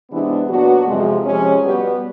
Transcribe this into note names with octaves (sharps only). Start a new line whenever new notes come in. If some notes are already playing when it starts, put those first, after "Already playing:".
C3 E3 G#3 B3 D4 E4
A#2 F#3 B3 D4 F#4
F2 C3 F3 G#3
C3 F3 G#3 C#4
B2 G3 B3 G4